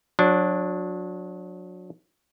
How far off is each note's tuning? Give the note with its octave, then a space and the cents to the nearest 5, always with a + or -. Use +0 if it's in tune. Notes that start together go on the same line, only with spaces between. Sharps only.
F#3 -30 D4 +0